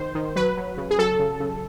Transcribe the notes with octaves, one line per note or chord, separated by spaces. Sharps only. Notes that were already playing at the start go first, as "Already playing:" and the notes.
Already playing: D#3 C5
D#3
F#3 B4
F#3
C#3
G#4
F#3 A4
C#3
C#3